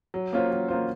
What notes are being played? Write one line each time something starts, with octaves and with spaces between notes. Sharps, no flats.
F#3
A#3 C#4 F4 C5
F#3
A#3 C#4 F4 C5